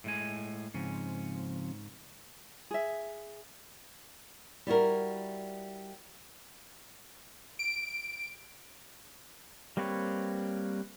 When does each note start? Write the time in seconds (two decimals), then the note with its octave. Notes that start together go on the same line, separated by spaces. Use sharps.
0.04 A2 G#3 G#5
0.74 G#2 C#3 F3 C4 C#4
2.71 G#4 E5
4.67 G3 E4 F#4 A#4
7.59 D7
9.77 G3 A#3 C4 B4 C#5